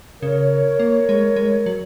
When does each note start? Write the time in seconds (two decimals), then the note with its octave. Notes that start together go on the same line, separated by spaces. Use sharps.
0.21 C#3 A#4 C#5
0.80 A#3
1.09 G#3
1.36 G#3
1.66 F#3